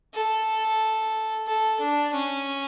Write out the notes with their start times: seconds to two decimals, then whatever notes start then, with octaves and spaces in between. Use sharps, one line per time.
0.14 A4
1.47 A4
1.80 D4
2.13 C#4